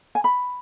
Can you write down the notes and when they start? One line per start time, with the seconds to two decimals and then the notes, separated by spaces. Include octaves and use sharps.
0.15 G#5
0.24 B5